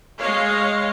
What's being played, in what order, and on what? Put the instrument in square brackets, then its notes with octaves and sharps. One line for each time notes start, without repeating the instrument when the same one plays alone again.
[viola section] G#3 C#5 D#5 F5